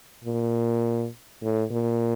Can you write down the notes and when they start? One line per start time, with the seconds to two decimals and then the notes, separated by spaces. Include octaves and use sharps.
0.24 A#2
1.43 A2
1.72 A#2